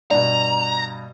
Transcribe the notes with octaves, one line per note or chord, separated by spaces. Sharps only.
G2 B2 D5 A#5